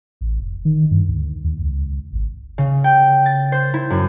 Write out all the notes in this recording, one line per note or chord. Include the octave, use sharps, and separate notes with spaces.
A1
F1
D#3
G2
D2
D#2
C#2
G#1
C#3
G5
A6
C5
E4
F#2